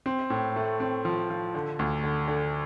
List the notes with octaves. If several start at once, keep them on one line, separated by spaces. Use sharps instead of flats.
C4
A2
A3
C4
F3
F3
D3
D2
D3
D3